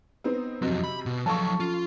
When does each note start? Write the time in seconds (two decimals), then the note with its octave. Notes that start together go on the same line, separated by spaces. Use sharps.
0.24 B3 C4 D#4
0.62 F2 C3 F#3 C4 F#4 D#5
0.84 B5
1.06 B2
1.26 F3 F#3 A4 A5 C#6
1.60 C#4 F4 A4